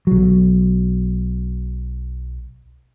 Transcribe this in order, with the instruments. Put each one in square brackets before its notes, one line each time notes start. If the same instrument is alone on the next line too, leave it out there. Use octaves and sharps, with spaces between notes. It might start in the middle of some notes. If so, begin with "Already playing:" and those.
[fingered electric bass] B1 F#3